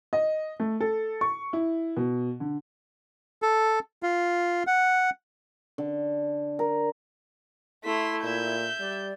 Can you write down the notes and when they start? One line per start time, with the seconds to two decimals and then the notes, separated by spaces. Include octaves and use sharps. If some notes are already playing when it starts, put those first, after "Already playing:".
0.13 D#5
0.60 A3
0.80 A4
1.21 C#6
1.53 E4
1.97 B2
2.40 D3
3.42 A4
4.03 F4
4.67 F#5
5.78 D3
6.59 A#4
7.84 A3 E4 C6 B6
8.24 A#2 E5 G6
8.80 G3 D5